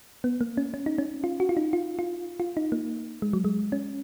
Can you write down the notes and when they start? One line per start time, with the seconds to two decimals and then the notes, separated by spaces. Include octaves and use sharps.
0.24 B3
0.41 A#3
0.57 C#4
0.74 C#4
0.86 D#4
0.98 C#4
1.24 F4
1.40 F#4
1.49 F4
1.57 D#4
1.73 F4
1.99 F4
2.40 F4
2.57 D#4
2.72 A#3
3.22 G#3
3.33 F#3
3.45 G#3
3.72 C#4